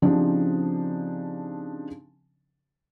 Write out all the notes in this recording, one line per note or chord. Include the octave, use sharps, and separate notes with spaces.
C#3 F3 C4 D4 D#4 G4